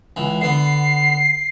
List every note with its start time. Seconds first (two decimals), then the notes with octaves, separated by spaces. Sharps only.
0.16 C#2 E3
0.41 D3 B3 C7